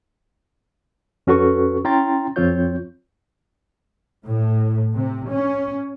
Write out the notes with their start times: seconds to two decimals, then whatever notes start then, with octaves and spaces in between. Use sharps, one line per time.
1.27 F2 C#4 F#4 A4 B4 C#6
1.84 C#4 E4 G5 A#5 C6 A6
2.36 F2 F3 C4 F4 C#5 G6
4.27 A2
4.95 C3
5.31 C#4